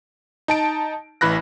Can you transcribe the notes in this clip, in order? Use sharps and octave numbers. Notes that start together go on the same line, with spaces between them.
D#4 A5 D7
A1 E3 B5 F#6 A#6